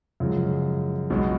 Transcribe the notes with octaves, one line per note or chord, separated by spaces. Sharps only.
F#2 C#3 F3 G#3
B1 B2 G#3